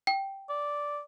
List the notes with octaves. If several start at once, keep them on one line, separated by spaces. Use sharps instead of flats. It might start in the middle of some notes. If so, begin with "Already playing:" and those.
G5
D5